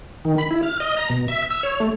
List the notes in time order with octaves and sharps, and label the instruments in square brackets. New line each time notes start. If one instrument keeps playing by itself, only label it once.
[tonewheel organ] D#3
B5
E4
F6
D#5
A#5
B2
E5
E6
C#5
A3